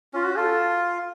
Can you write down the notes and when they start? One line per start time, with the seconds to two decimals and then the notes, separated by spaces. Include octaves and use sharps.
0.14 C#4 F4
0.26 F#4
0.36 F4 A4